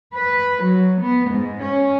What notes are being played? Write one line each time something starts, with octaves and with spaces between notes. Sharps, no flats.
B4
F#3
B3
G#2
C#4